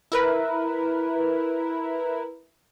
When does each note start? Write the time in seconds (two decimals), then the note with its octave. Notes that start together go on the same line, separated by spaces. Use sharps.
0.12 E4 A#4 B4